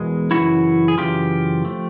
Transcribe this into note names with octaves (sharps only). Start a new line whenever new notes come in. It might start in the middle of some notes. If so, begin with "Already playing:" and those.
Already playing: E2 B2 G#3 A#4
F#2 C#3 E3 E4 F#4
G#4
F#2 C#3 E3 F4 G4
F3 A3